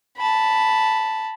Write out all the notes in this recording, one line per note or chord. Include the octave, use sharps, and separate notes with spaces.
A5 B5